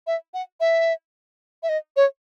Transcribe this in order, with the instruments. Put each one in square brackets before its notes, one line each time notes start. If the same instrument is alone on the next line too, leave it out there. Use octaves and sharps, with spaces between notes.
[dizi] E5
F#5
E5
E5
D#5
C#5